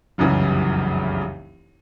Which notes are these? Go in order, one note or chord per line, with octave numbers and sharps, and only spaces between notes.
F1 C2 F#2 C#3 E3